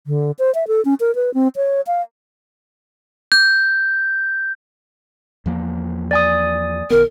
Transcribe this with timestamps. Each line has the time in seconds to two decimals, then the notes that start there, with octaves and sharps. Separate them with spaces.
0.07 D3
0.39 C5
0.55 E5
0.68 A4
0.85 C#4
1.00 A#4
1.15 B4
1.34 C4
1.56 C#5
1.87 F5
3.32 G6
5.46 E2 F3 A#3
6.11 D5 G#5 D#6
6.90 B1 D#3 B3 A#4